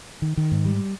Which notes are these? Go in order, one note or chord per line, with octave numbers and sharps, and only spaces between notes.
D#3
D#3
G#2
G3